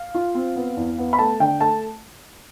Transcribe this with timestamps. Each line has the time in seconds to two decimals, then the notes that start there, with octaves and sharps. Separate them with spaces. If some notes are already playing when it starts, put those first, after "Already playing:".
Already playing: F5
0.15 F4
0.35 C4
0.56 B3
0.77 E2
0.98 B3
1.13 B5
1.19 A3 A5
1.40 D3 G5
1.61 A3 A5